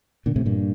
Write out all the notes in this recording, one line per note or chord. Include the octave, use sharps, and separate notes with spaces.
A#2 D3
A2 C3
G2 A#2